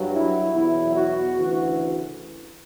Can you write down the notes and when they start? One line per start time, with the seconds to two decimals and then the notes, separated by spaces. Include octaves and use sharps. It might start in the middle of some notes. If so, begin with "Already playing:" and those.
Already playing: G2 F#3
0.13 E4
0.53 E2 B2 F#3 E4
0.93 F#4
1.33 D2 C#3 E3 F#4